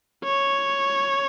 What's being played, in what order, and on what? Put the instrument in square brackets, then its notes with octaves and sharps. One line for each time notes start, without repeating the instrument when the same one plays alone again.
[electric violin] C#5